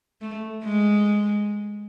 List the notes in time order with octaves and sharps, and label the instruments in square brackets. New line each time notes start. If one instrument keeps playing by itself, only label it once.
[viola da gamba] A3
G#3